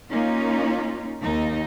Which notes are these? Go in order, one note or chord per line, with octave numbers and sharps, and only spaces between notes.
A#3 C#4 D#4 F4
D#2 D#4